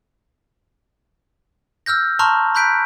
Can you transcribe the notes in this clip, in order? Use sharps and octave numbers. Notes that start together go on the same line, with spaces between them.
E6 F6 G6 A#6
A5 A#5 C6 C#6 F6
A#5 B5 F#6 G6 B6 D7